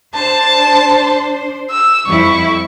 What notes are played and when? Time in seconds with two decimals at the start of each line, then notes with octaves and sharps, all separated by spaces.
0.15 D4 C5 A5
1.71 E6
2.06 F2 G3 E4 C#6